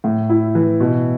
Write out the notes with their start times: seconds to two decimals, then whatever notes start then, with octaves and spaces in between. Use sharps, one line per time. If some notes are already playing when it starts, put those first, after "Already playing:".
0.04 A2
0.29 E4
0.55 E3
0.80 B2